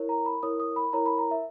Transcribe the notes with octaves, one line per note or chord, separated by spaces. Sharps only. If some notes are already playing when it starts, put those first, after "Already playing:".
Already playing: E4 A#4 C#5
A#5
B5
E4 A#4 C#5 D#6
D#6
B5
E4 A#4 C#5 A#5
B5
A#5
E5